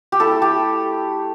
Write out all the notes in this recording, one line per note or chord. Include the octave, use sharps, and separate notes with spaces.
G4
A3 E4 A4
G4